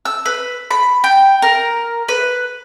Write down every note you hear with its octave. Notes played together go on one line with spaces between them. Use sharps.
E6
B4
B5
G5
A#4
B4